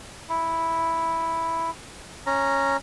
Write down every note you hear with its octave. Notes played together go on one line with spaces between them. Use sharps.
E4
C#4 A#5